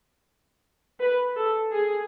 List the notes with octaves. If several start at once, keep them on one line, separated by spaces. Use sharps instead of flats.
B4
A4
G#4